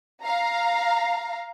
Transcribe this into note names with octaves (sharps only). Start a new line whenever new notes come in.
F5 A#5